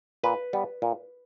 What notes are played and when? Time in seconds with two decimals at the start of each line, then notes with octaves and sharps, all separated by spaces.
0.23 A#2 B4
0.53 G3 B3
0.82 A#2